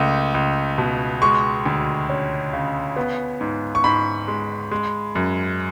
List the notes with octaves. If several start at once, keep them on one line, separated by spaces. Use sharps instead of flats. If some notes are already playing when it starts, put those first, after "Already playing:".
Already playing: C#2 A3
C#2
B2
G#3 C#6
D2
C#4
C#3
B3
G#2
C#6
G#2 B5
G#3
G#3
F#2